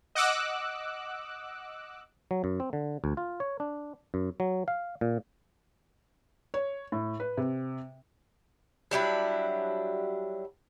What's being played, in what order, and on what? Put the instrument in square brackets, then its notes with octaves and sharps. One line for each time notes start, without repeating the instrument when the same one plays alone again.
[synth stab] D#5 F#5 D6 E6 F#6
[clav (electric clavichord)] F#3
F#2
C4
D3
D2
F4
C#5
D4
F#2
F#3
F5
A#2
[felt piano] C#5
A2
B4
C3
[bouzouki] F#3 G3 D4 E4